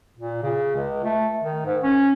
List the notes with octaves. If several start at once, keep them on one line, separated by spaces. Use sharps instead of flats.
A#2
C#3
C#2
A3
D#3
G#2
C#4